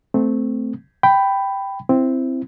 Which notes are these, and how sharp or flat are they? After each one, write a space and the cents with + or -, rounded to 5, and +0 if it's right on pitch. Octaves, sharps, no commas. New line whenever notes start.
A3 +0 C4 -15
G5 +0 B5 +10
C4 +0 E4 +15